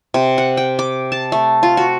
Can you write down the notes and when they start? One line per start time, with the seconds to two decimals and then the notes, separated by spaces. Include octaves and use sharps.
0.14 C3
0.38 F#5
0.57 G5
0.79 D6
1.12 A5
1.32 A3
1.63 F4
1.77 F#4